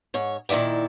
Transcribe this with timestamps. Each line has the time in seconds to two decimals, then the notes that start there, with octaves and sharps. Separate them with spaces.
0.14 G#2 C#5
0.49 A#2 D#3 E4 D5 G5